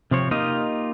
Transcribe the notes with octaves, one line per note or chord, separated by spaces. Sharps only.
C3 F3 C4 C#5
A#3 D#4 F4 G4 D#5